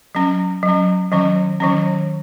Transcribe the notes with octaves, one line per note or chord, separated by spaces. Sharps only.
F#3 C#4
F#3
C#4
D#3 F#3 C#4
D#3 F#3 C#4